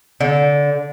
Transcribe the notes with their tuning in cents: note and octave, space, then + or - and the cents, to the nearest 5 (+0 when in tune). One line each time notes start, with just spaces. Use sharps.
D3 -20